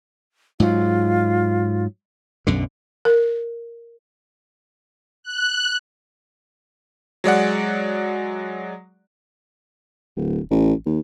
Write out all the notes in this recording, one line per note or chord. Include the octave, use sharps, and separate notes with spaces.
G#2 F#3 F4
B1 F#2 D3
A#4
F#6
F#3 G#3 D5 F#5
D1
A1
D#2